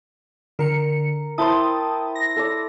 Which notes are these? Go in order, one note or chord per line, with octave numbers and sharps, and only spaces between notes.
D3 A#4 C#7
E4 C5 G5 A5 D#6
A#6
A4 D5